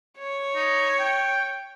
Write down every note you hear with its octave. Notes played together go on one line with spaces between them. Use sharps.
C#5
D#4
G5